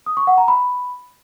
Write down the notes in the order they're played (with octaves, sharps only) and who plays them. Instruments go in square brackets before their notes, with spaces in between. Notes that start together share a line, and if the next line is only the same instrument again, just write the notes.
[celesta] D#6
C#6
F#5
A#5
B5